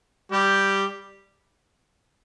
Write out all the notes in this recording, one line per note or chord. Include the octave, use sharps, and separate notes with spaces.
G3 G4